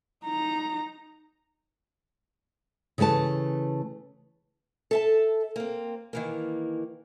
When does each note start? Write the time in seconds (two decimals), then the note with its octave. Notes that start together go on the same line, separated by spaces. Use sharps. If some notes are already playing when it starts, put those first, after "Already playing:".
0.25 D#4 A#5
2.98 C#3 E3 A3 B4 A5
4.91 A4 E5 A5
5.56 A#3 C4
6.13 D#3 E3 A#3